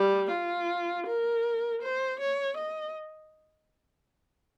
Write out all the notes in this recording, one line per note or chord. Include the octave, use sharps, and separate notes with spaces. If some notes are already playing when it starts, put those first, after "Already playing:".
Already playing: G3
F4
A#4
C5
C#5
D#5